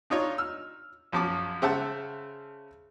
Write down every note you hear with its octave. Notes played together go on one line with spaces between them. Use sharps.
D4 D#4 F4 C#5
E6 F6
A#1 F#2 F3 A5 D6
C#3 C5 E5 F#5 A5